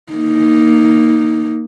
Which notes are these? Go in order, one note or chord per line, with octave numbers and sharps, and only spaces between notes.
A#3 D#4